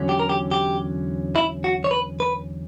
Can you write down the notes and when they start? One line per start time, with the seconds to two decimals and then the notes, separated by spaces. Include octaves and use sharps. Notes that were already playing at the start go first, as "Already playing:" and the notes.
Already playing: E2 D3 F#3 C#4
0.09 G4
0.20 A#4
0.29 G4
0.51 G4
1.36 E4
1.64 F#4
1.84 C#5
1.91 B4
2.20 B4